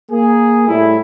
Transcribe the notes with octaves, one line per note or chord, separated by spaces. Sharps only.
A#3 G#4
A2 G3 E4